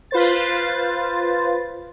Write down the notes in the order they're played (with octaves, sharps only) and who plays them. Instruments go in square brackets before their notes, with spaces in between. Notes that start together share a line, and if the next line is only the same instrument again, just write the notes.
[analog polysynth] F4 B4 C5 A6